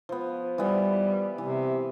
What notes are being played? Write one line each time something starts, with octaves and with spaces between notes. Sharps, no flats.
F3 B3
E3 G3 B3
C3 E3